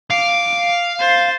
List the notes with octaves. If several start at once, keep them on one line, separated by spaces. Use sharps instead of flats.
F5 D6
C5 A6